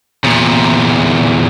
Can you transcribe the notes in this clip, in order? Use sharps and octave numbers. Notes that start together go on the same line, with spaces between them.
E2 A#2